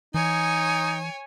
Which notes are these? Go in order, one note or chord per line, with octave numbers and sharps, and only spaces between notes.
E3 D#4 C#5 G#5